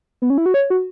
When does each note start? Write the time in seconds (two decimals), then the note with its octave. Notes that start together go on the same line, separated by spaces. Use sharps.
0.22 B3
0.30 C#4
0.38 E4
0.46 F#4
0.54 C#5
0.70 F#4